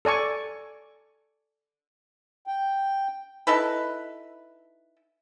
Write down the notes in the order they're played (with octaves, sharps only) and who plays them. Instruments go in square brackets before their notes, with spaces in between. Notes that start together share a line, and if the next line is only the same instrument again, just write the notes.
[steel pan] A4 D5 G#5 C#6
[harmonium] G5
[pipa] D#4 E4 A4 B4